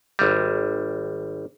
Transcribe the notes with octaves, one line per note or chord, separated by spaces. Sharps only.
G#1 G3